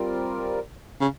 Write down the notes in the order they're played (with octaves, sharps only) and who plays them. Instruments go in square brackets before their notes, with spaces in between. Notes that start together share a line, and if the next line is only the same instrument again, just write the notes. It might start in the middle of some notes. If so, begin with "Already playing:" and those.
Already playing: [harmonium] G3 C4 F4 A#4 D5
[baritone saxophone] C#3